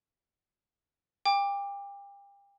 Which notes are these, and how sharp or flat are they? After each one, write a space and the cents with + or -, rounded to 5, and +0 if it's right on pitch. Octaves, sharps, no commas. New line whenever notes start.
G5 +35 D6 +0